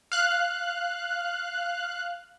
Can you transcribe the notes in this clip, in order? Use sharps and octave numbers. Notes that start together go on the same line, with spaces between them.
F5 F#6